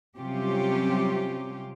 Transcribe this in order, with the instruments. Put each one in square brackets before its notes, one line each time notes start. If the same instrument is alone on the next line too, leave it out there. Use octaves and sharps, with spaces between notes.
[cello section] C3 F#3 G3 C#4 F4 G4